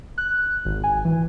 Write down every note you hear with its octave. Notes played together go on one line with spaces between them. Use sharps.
F#6
G#1
G#5
E3